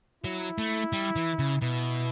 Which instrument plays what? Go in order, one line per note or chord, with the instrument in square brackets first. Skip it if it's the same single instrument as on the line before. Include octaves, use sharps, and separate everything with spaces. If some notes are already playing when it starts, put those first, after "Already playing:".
[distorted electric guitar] F#3 [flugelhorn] E4
[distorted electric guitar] A3
G3
E3
C#3
[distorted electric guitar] B2 [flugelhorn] E4